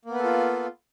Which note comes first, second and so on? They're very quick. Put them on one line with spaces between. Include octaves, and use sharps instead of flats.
A#3 B3 B4 A4 F4